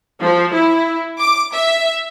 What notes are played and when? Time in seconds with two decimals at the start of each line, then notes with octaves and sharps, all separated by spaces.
0.22 F3
0.54 E4
1.19 D6
1.54 E5